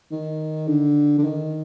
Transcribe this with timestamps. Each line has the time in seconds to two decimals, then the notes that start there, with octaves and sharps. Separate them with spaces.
0.11 D#3
0.68 D3
1.18 D3
1.24 D#3